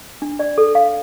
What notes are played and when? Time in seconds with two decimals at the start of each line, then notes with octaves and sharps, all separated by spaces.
0.22 D4
0.39 D5
0.58 A4
0.75 F5